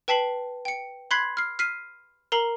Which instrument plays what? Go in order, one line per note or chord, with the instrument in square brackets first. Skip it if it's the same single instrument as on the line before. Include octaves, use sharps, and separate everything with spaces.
[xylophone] B4 G5 A5 B6 C7 F#7
G5 C#7
B5 C6 F#6 G#6 B6 C7
F6 C7
F6 B6 C7 D#7
A#4 A#5 C7 F#7